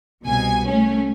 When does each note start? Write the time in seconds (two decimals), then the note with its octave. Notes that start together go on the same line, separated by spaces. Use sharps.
0.24 C2 B2 G#5
0.68 A3 C#4